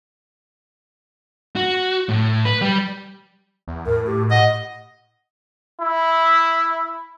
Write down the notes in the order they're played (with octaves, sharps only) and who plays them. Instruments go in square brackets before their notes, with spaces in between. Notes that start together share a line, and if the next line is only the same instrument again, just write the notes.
[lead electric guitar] F#4
A2
B4
G3
[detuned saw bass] E2
[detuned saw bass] A2 [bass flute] A#4
[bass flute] G4
[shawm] D#5 [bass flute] F#5
[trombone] E4